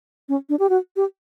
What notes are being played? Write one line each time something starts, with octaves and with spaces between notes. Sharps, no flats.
C#4
D4
G4
F#4
G4